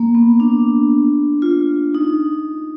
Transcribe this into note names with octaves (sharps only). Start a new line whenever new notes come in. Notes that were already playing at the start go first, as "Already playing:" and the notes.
Already playing: A#3
B3
D4
F4
D#4